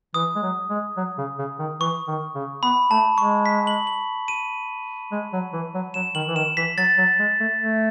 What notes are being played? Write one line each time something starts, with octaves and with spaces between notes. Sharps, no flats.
E3 D#6
G#3
F#3
G#3
F#3
C#3
C#3
D#3
E3 C#6
D#3
C#3
B3 B5
A3 A5
G#3 C#6
B6
F#7
F#7
D#7
G#3
F#3
E3
F#3
F#3 E7
D#3 F#7
E3
D#3 E7
E3 B6
F#3 A6
F#3
G#3
A3
A3